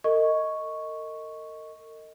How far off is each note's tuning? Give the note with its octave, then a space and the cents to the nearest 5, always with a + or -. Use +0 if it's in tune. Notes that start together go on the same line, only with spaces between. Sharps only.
A#4 -40 D#5 +10 C#6 +0